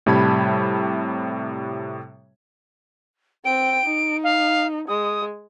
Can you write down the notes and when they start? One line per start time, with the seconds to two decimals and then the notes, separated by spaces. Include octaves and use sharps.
0.06 A2 C3 G3 A5 B5 G#6
3.45 C4 G5 D7
3.85 D#4
4.24 F5
4.88 G#3 D#6